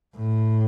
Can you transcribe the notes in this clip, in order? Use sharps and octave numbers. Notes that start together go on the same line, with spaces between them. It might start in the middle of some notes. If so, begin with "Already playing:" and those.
A2